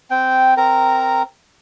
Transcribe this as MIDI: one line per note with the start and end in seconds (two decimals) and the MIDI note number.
0.11 0.54 60
0.11 0.54 79
0.57 1.23 60
0.57 1.23 70
0.57 1.23 82